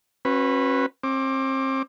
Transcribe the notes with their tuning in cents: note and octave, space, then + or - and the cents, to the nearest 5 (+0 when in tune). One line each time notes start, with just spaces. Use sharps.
C#4 -35 F#4 +0 B4 +0
C4 +35 D6 +5